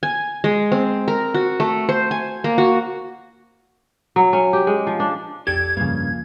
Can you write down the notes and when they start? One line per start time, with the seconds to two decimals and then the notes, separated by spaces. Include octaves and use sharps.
0.03 G#5
0.44 G#3
0.72 C4
1.08 A#4
1.34 F#4
1.60 A3
1.89 C5
2.11 G#5
2.44 A#3
2.58 F#4
4.16 F#3
4.33 C#4
4.53 G4
4.67 G#3
4.87 F3
5.00 D4
5.47 B1 F2 G4 A4 D5 G#6
5.77 G2 C#3 F3 A#3